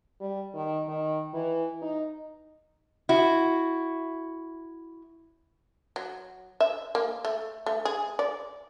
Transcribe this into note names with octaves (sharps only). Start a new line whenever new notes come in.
G3
D#3
D#3
E3
D#4
E4 F#4
F#3
E5
A#3
A3
A3
G#4
D5